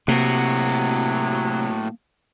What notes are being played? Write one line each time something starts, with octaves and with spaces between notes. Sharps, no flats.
A2 C3 F#3 A#3 F#4